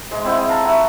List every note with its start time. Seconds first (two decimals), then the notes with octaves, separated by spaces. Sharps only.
0.11 G#2 G#3
0.24 C4 E4 F#5 G5
0.37 G#4
0.49 F5 A5 A#5
0.64 E4 F#5 C#6